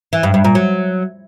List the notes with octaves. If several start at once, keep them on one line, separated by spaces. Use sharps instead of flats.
E3
G2
G2
A#2
F#3